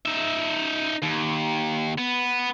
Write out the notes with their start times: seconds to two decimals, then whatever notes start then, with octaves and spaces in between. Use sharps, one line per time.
0.06 D#4 E5
1.03 D#2
1.98 B3